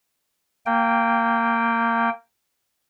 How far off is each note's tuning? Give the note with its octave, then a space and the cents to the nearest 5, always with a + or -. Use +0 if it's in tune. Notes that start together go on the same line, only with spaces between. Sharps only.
A#3 -15 G5 +0